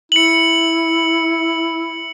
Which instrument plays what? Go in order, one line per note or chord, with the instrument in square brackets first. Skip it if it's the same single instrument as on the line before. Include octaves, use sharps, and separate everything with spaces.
[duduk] E4 [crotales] C#7 F#7